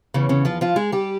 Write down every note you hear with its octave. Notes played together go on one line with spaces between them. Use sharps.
E2 C#3 E3 C#4
C#3 C#4
F3 F4
F3 F4
G#3 G#4
G3 G4